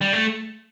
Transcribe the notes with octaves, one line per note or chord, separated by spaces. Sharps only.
G3
A3